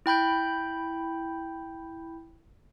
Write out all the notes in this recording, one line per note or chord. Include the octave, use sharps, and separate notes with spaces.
E4 G5 B5 G6